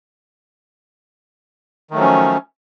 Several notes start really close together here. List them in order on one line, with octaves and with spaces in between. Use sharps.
D#3 A3 F#3 F3 C#4